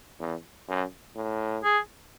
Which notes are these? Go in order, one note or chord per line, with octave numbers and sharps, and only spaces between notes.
E2
F#2
A2
G#4